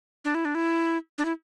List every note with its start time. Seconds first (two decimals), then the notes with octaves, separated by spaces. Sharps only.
0.25 D4
0.34 E4
0.45 D4
0.55 E4
1.18 D4
1.25 E4